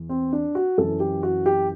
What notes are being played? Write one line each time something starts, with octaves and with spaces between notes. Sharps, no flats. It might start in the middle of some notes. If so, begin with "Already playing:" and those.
Already playing: E2
C4
D4
F#4
F#2 E3 A4
G4
F#4
G4